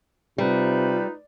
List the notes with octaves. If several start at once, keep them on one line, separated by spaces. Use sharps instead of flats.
C3 G3 D#4 F4 B4